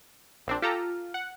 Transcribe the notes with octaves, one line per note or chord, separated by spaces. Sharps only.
A#1 C4 D4
F4 G4 A4 A#5
F#5